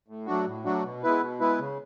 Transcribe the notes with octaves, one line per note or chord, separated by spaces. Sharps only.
A2
F#3 A3 D4 F#4
A2
F#3 A3 D4 F#4
B2
G#3 B3 E4 B4
B2
G#3 B3 E4 B4
C#3